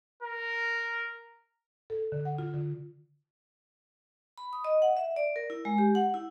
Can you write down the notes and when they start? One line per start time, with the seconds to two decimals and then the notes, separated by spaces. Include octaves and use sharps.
0.23 A#4
1.90 A4
2.12 D3
2.25 F#5
2.39 F4
2.54 D3
4.38 B5
4.53 D#6
4.64 D#5
4.82 F#5
4.97 E5
5.16 D5
5.36 A#4
5.50 E4
5.65 G#3
5.78 G4
5.95 F#5
6.14 E4